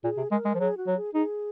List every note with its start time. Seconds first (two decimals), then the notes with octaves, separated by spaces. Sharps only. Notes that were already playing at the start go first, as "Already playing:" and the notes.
0.04 A#2 G#4
0.17 C3
0.31 G#3 A#4
0.45 G#3
0.55 F3
0.60 F#3 G#4
0.77 F#4
0.87 F#3
0.97 G#4
1.14 D#4 G#4